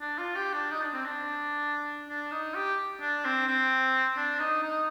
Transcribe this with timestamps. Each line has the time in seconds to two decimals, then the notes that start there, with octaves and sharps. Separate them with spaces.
0.01 D4
0.18 F4
0.36 G4
0.53 D4
0.71 D#4
0.82 D4
0.94 C4
1.05 D4
2.09 D4
2.32 D#4
2.55 G4
3.01 D4
3.25 C4
3.47 C4
4.16 D4
4.39 D#4
4.63 D#4